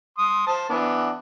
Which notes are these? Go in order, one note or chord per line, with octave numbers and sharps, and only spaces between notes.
C6 D#6
C5 A5
E3 B3 D4